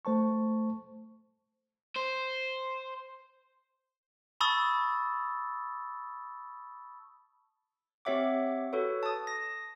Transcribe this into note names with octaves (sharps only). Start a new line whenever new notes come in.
A3 C5 A5 C#6
C5
A5 B5 C#6 D#6 E6 A6
C4 G4 C#5 E5 F#5 D6
F#4 A4 B4 C#5
A5 D#6
A#6